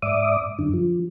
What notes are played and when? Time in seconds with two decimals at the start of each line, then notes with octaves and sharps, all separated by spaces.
0.02 G#2 D5 E5 D6 D#6
0.59 F#2 D3
0.74 F3